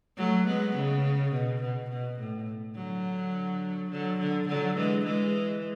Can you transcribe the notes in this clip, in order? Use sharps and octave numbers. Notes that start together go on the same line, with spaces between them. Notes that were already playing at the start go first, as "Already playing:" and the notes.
F#3 A3
G#3 B3
C#3
B2
B2
B2
A2
D3 F#3
D3 F#3
D3
D3 F#3
E3 G#3
E3 G#3